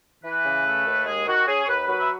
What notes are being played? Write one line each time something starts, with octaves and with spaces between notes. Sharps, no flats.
E3 B4
C#3
A3
D#2
G#3 G#4
D#3 F#4
C#4 G#4
C#5
D#2 B4
F#3 B4
E5